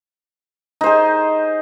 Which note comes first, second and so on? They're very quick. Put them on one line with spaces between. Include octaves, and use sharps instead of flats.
D#4 C5 G#4